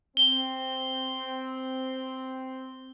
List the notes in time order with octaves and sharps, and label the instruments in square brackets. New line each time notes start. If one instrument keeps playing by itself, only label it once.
[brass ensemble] C4 [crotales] G7